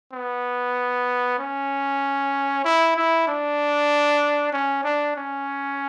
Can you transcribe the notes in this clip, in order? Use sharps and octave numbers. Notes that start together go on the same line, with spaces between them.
B3
C#4
E4
E4
D4
C#4
D4
C#4